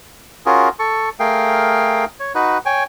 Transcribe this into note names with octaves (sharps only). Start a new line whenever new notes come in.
C#4 F4 F#4 G#4 A#4
A4 C#6
A3 G#4 A#4 F5 G5
C#5
D#4 F#4 B4
C#5 G5 G#5